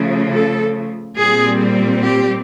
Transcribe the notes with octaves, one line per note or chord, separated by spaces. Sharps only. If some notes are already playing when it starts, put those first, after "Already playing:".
Already playing: C#3 F3 A3
A4
A#2 G3 C4 G#4
G4